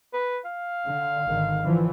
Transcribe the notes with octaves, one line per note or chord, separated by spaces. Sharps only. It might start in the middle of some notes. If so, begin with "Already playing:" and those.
B4
F5
D3
G#1 D3 D#3
D3 E3 F3